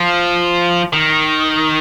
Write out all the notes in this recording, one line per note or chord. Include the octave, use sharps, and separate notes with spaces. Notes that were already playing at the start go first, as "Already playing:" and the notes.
Already playing: F3
D#3